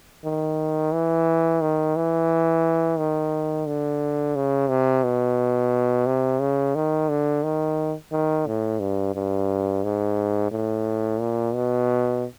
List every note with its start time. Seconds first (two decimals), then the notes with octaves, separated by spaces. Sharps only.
0.25 D#3
0.93 E3
1.61 D#3
1.96 E3
2.98 D#3
3.66 D3
4.35 C#3
4.70 C3
5.04 B2
6.06 C3
6.41 C#3
6.75 D#3
7.09 D3
7.44 D#3
8.12 D#3
8.47 A2
8.80 G2
9.15 G2
9.84 G#2
10.51 A2
11.20 A#2
11.55 B2